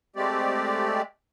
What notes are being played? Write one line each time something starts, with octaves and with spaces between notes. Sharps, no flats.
G#3 A3 C4 G4 D5